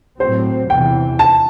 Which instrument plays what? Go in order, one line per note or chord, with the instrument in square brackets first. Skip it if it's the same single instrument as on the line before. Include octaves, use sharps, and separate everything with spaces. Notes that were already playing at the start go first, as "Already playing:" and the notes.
[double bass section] A2 F#3 C4 [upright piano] C5
[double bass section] E2 C3 E3 [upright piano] G5
[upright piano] A5